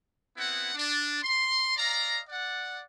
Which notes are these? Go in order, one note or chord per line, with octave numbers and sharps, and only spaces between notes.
B3 C4 E4 G#4 F#5
D4
C6
D5 D#5 F5 A#5
D5 F#5